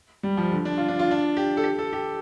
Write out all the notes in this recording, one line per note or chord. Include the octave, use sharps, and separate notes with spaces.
G3
F3
D3
D4
F4
D4
F4
D4
G4
A4
G4
A4
G4